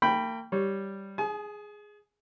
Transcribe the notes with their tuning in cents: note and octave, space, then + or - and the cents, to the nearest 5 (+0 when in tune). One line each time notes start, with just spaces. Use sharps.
A#3 -35 G5 +0 B5 +0
G3 +0 C#5 +0
G#4 +0 G#5 +40